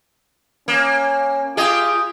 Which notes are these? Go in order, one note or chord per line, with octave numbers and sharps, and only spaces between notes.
A#3 C#4
F4 G4 G#4 D#5